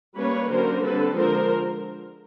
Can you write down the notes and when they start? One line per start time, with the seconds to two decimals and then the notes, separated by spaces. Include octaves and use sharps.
0.16 G3 A#3 C#4 B4 C#5
0.49 D3 F#3 A#3 C#4 A#4 C5
0.82 D3 G3 C4 A4 B4
1.16 D3 F3 G#3 A#4 C5